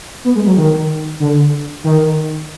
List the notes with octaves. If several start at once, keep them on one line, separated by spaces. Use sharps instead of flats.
B3
G#3
F#3
D#3
D3
D#3